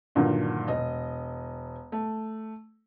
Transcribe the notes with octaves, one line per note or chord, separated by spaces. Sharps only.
G2 A#2 D3 D#3 F3 F#3
E1 D#5
A3